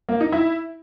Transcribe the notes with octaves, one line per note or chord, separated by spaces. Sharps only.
A#3
D#4
E4